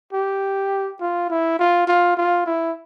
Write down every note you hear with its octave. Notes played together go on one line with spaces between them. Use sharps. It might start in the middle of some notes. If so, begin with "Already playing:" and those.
G4
F4
E4
F4
F4
F4
E4